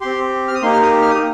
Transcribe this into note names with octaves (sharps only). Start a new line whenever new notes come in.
C4 G4 C6
F6
D#6
A#3 D#4 G4 C6
F6
D#6
F6
D#6